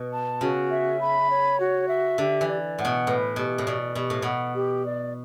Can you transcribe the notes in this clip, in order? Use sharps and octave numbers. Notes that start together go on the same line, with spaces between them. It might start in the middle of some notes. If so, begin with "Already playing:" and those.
Already playing: B2
A5
C#3 F#4
E5
B5
C#5
F#4
E5
D3 G4
E3
D5
A2 F#5
B2
A2 B4
B2 G4
A2
B2 D5
B2 G4
A2
B2 F#5
G4
D5